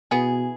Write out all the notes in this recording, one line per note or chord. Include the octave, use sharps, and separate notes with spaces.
B2 E3 B3 G#4